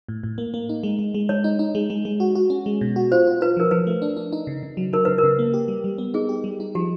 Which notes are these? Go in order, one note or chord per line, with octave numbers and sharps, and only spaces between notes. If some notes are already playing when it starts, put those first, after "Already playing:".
A2
A2
A#3
A#3
D#4
G#3
G#3
G#3
G#3 C#5
D#4
D#4
G#3
G#3
G#3
F#4
F#4
C#4
G#3
B2
F#4
F4 C5
F4
F4 B4
F3 A#4
F3 B4
A3
D4
D4
D#4
C#3
C#3
F#3
F#3 A#4
C#3 B4
A#4
C#3
A#3
G4
G3
G3
B3
D#4 G#4
G4
G3
D#4
F3 G4